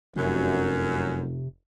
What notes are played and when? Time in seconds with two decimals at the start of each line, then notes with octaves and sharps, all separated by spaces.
0.16 F1 F#2 C3